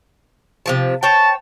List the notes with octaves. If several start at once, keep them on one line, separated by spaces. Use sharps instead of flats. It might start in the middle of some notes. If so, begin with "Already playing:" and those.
C3 F3 A5
C5 C#5 G5 A5